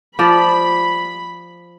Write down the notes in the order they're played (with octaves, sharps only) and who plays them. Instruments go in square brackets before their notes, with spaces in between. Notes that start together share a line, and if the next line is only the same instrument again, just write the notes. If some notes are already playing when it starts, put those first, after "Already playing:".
[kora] F3 D5 [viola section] B5